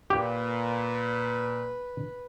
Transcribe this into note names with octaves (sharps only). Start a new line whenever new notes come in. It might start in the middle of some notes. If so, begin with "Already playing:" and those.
A#2 G4 B4